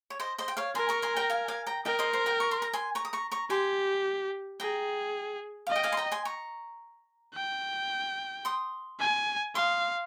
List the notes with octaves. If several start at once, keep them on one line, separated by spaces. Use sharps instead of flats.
C#5
C5 D#5
C5 D#5
G5
C#5 F5
A#4 G#5 C6
A#5 C#6
G#5 C6
G5 A#5
F5 G#5
F5 G#5
G5 A#5
A#4 D#5 G5
C5 D#5
C5
G5 A#5
C#6
C6
A#5
G#5 C6
A#5 C#6
D#6
A#5 C#6
A#5 C#6
G4 G#5 C6
G#4 G5 A#5
D#5 F5
G5
F5 G#5
C6
G5 A#5
G#5 C6
A#5 C#6
G5
C6 D#6
G#5
F5 C6 D#6